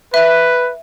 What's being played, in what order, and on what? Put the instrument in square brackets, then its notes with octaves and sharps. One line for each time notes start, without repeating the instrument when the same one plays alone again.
[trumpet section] B4 [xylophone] E5